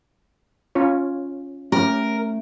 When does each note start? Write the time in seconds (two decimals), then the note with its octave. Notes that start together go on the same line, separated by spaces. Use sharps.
0.75 C#4 F4 C#5
1.72 A3 C#4 G4 A#4